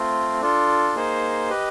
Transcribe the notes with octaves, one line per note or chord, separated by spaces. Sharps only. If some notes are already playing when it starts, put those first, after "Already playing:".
Already playing: A3 C4 F4
D4 F4 A4
A#3 D#4 G#4 C5
G4 B4 D#5